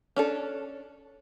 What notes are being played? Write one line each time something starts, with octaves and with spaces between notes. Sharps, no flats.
C#4 D4 A4